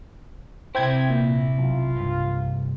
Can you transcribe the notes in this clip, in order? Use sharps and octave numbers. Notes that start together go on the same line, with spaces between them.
C3 C4 E4 G5 G#6
A#2
B1 F4
C2 G2